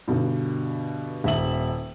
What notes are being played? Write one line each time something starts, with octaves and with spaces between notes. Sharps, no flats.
G2 B2 D3
D#1 E5 F#7